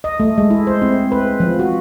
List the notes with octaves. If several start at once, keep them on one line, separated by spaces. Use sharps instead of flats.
D#5
A3
G#3
E4
C5
C4
B4
F3
F#4